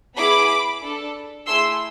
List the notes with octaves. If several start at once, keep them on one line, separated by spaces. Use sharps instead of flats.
B3 E4 G#4 B5 D6
D4 A4
A3 E4 G#4 C6 E6